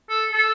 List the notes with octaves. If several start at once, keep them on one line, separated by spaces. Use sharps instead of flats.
A4
A4